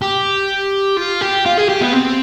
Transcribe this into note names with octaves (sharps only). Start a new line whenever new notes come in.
G4
F4
G4
F4
G#4
G4
B3
C4